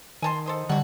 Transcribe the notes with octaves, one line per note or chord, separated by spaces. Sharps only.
D#3 G#5 A5 C6
A4 C5 D#5
D3 D#3 G3 F#4 F#5